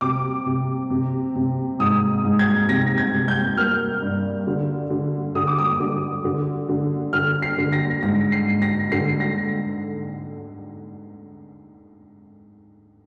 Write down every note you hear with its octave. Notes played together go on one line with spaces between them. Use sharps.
C3 D6
C3
C3
C3
G#2 D#6
G#2
G#6
C3 A#6
G#6
C3
G6
A#3 F6
G2
D3
D3
D3 D#6
D6
D#6
D3
D3
D3
D3 F6
C7
D3
A#6
G#2 A#6
C7
G#2
A#6
D3 C7
A#6